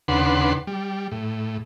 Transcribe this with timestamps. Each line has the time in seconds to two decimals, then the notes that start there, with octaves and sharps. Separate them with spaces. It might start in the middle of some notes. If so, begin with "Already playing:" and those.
0.08 D#2 C#3 D4 B4 F#5 C6
0.67 G3
1.11 A2